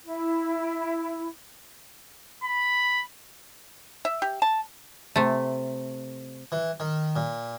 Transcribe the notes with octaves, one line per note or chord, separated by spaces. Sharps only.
E4
B5
E5
G4
A5
C3 A3
E3
D#3
A#2